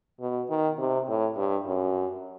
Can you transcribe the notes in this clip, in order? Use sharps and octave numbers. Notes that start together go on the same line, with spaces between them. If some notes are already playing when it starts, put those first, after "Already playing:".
B2
D#3
C3
A2
G2
F#2